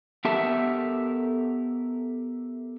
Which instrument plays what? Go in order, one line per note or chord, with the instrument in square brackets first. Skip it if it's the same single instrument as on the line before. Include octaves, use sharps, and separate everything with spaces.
[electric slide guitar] B3 G4 A4 A#4 E5 A5